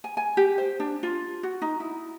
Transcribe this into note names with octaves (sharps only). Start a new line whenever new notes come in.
G#5
G#5
G4
C5
D4
F4
F#4
D#4
E4